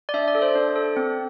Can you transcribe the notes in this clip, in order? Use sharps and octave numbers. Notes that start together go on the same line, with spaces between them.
D5
D4 E5
D5
A4
C5
D4
A4
C4